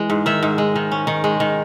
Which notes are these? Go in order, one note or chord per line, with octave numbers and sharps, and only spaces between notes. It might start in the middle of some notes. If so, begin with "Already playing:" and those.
Already playing: E3 G#3
G#2
D#3 E5
G#2
G#3
D#3
C#4
D#3
G#3
D#3